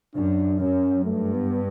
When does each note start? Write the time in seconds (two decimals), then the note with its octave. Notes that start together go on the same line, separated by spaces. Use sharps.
0.15 F#2 D4
0.60 F#2 C#4
1.04 G2 A3
1.34 B3